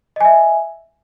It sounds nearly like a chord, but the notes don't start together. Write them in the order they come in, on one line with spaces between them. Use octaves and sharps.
D#5 G#5 E5